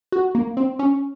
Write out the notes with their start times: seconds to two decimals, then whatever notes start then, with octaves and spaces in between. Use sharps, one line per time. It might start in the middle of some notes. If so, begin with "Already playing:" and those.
0.12 F#4
0.35 A#3
0.57 C4
0.79 C#4